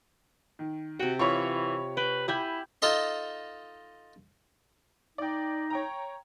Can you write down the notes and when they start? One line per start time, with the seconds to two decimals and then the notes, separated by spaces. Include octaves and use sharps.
0.59 D#3
0.99 C3 F#4 G5
1.19 E3 F4 C#5 B5 C#6
1.97 B4 G5
2.28 E4 G4 F#5 G#5 B5 G6
2.82 D#4 F4 A4 D#5 C6
5.18 D#4 D5 G5
5.70 C#5 G5 A#5